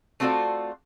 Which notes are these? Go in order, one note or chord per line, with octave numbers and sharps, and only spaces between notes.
A3 C4 F4 F#4 A4 D5